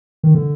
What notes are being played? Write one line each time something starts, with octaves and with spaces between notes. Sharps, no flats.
D#3
D3